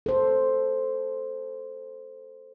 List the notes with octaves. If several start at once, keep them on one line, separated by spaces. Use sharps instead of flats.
A4 C5